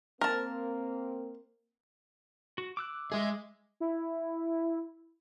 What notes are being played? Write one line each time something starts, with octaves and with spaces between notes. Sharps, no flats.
A#3 C4 A#4 A5
F#4
D6 E6 F#6
G#3 G#4 D#5 E5
E4